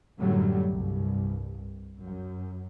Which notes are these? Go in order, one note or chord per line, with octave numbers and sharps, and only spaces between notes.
F#2 A2 D3 F#3 G3
C2 G2
F#2